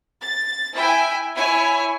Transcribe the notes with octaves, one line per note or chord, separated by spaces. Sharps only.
A6
E4 E5 G5 G#5
E4 C#5 G#5